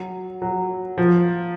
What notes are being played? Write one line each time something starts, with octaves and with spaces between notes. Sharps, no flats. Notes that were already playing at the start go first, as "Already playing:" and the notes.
Already playing: F#3
F#3
F3